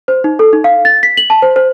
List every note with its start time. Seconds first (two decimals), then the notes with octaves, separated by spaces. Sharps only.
0.08 C5
0.24 D#4
0.39 A4
0.53 D#4
0.64 F5
0.85 A6
1.03 B6
1.17 F#7
1.30 A5
1.42 C5
1.56 C5